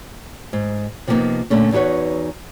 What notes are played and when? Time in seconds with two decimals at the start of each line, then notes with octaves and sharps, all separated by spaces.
0.53 G#2
1.07 C3 F3 G3 A#3 B3 D#4
1.50 A#2 D3 A3 C#4
1.72 E2 D#4 F#4 B4 C#5